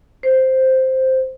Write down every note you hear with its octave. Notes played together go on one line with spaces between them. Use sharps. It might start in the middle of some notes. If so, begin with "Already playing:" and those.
C5